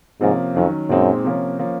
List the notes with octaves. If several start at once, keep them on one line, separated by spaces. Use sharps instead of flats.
G#2 C3 F3 A#3 C#4
F2 D#3 F#3 C#4
F#2 A#2 G#3 C4 D#4
C3 F3 A#3 C#4
F3 A#3 C#4